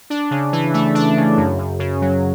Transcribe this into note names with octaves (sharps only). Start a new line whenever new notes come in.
D4
C#3
E3
A3
D4
C#3
F#2
F#2
C#3
F#3